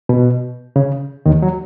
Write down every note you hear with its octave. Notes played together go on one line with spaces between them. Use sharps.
B2
C#3
D#2 D#3
F#3